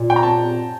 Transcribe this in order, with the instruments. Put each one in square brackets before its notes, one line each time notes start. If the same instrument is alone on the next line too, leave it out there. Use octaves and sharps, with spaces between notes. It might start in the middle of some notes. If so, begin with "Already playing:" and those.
Already playing: [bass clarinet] A#2
[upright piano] G5
A#5
A5